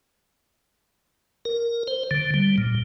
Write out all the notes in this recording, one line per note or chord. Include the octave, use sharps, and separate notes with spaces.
A#4
C5
D3
G3
A#2